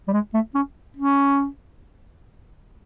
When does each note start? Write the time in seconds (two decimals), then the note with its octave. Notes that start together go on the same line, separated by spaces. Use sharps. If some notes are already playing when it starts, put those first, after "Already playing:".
0.08 G3
0.13 G#3
0.34 A3
0.55 C#4
0.97 C#4